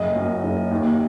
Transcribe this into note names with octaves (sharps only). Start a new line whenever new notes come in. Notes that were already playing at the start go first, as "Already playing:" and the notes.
Already playing: F#1 D#5
F#2
F#1
D#2